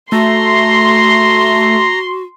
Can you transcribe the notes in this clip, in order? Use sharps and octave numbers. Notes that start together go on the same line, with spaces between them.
A3 F#4 A#5 C6